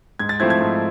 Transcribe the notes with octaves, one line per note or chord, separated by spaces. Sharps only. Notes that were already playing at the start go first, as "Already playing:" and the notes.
G#2 G#6
A6
F3 A3 C4 E4 G#6
G#6
G#2